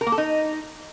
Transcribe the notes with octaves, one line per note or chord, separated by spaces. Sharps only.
A#4
A#3
A4
D#4